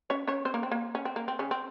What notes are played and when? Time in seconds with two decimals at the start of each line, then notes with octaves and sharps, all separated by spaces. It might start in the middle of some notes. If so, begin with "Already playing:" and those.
0.10 C#4 C#5
0.27 C#4 C#5
0.45 C4 C5
0.54 A#3 A#4
0.63 C4
0.71 A#3
0.95 C#4
1.05 C4
1.16 A#3
1.28 C4
1.39 C#3 C#4
1.51 C4